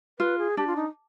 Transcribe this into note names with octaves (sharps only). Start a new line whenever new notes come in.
F4 B4
G#4
D4 G4
F4
D#4